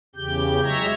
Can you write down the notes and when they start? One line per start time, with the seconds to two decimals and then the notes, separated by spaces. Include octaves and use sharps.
0.16 E2 C#3 G4 G6
0.63 F#3 G#3 C#5 E5 A#5 G#6